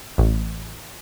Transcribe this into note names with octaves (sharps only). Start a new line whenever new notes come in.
A1